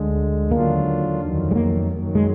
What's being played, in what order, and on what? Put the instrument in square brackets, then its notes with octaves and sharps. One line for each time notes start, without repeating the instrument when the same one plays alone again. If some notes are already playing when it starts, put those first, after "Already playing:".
Already playing: [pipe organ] D2 D3 G#3
[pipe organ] D#2 D3 F#3 D4 F4 [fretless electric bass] A#3
[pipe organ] F2 D#3 F#3
[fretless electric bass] G#3
A#3
[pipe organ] F#2 D#3 F#3
[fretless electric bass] G#3